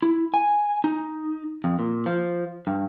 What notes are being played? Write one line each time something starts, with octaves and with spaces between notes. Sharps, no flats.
E4
G#5
D#4
F2
A#2
F3
G2